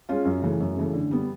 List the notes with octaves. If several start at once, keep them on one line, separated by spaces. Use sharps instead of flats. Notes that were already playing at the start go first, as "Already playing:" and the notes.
G#3 C#4 F4
F#2
C#3 E3 A3
F#2
C#3 E3 A3
D3
G3 B3